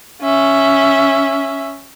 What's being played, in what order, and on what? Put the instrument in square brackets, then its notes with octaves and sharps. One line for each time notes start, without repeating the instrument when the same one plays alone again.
[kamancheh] C#4 E5